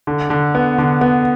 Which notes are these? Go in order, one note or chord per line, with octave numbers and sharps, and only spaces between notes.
D3
D3
B3
D3
B3